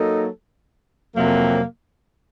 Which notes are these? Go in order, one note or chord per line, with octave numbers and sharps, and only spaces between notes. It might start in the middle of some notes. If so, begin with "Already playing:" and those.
Already playing: F#3 A#3 D#4 A4
F2 C3 F#3 A#3